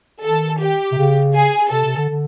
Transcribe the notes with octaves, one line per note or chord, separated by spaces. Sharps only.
D#3 A4
G4
C3
C#3
G#4
C3 A4
C3
D3
D3